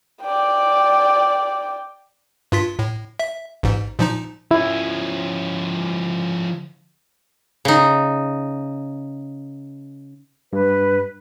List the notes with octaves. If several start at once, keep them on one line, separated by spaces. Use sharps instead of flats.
D5 G5
G2 F4 B6
A2
E5
A1 G#2
A#2 F3 D#4
F3 C#4 E4
C#3 D#4
G2 B4